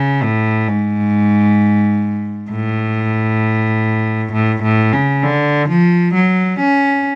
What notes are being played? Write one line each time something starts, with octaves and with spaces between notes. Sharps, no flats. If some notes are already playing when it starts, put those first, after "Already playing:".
Already playing: C#3
A2
G#2
A2
A2
A2
C#3
D3
F3
F#3
C#4